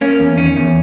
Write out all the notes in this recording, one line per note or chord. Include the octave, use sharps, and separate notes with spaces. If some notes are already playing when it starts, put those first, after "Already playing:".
A#3 C#4
E2
D#3 C#4
E2